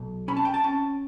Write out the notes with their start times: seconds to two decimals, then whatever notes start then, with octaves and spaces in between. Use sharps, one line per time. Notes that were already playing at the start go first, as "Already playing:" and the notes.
Already playing: B1
0.28 C#4 B5
0.37 A5
0.45 G5
0.54 A5
0.64 C#4